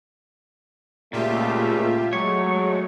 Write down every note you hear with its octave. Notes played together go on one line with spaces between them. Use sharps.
C#2 A#2 A3 F4 G4 E5
F#3 G#3 A3 C#5